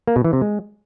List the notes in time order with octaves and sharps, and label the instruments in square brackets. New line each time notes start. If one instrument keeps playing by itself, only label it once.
[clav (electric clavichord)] A#3
B2
E3
C3
G#3